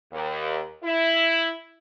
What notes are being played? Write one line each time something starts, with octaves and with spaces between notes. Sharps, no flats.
D#2
E4